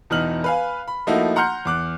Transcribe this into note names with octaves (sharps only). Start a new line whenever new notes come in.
E1 E3 B3 D#4 F6 F#7
B4 F5 G#5
B5
F3 A3 A#3 D#4 E4 F#4
F#5 A#5 C6 F6 G6 C#7
E2 D6 F#6